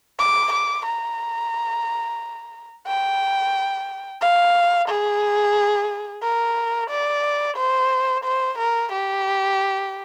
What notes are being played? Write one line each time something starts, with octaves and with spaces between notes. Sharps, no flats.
D6
D6
A#5
G5
F5
G#4
A#4
D5
C5
C5
A#4
G4